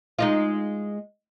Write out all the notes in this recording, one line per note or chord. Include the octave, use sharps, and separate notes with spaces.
G#3 D#4 F4